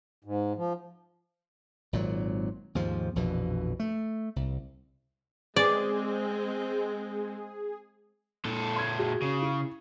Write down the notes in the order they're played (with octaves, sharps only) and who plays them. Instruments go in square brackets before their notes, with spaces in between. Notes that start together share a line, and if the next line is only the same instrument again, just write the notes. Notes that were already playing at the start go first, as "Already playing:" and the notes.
[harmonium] G#2
F3
[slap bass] G#1 A#2 F#3
D#2 G#2 F3
A#1 F2 B2 E3
A3
C2
[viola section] G#3 C4 [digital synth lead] G#4 [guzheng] D5
[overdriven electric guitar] A#2 A4
[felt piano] C6 G#6
F#4 G#4
[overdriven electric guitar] C#3
[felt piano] E4